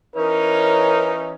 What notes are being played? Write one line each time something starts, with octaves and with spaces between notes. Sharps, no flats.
E3 C#4 D#4 A#4